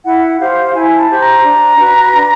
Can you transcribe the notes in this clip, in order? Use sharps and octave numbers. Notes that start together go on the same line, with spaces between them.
E4 F#5
G4 C5 F5
E4 G#5
A5
G4 C5
A#5
D4
F#4 B4
D4